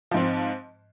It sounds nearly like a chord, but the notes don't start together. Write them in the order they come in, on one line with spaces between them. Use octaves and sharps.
F3 G#2 C4